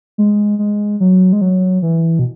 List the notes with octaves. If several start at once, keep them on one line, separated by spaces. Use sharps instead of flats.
G#3
G#3
F#3
G#3
F#3
E3
B2